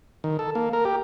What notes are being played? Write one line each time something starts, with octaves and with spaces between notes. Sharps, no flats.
D#3
A4
A#3
A#4
G4